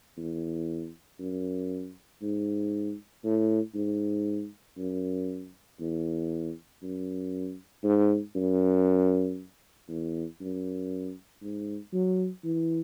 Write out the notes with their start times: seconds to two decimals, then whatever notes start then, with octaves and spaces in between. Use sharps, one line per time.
0.17 E2
1.19 F#2
2.22 G#2
3.24 A2
3.74 G#2
4.77 F#2
5.80 E2
6.82 F#2
7.84 G#2
8.35 F#2
9.88 E2
10.40 F#2
11.42 G#2
11.93 F#3
12.44 E3